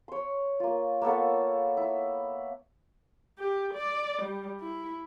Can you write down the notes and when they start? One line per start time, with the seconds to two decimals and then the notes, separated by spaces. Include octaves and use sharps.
0.08 C#5 C6
0.60 A#3 F4
1.02 A#3 B3 A4 C#5
1.77 E4
3.39 G4
3.74 D5
4.22 G3
4.60 E4